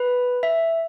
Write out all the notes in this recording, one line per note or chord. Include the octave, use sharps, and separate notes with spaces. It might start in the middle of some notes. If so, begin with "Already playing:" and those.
Already playing: B4
E5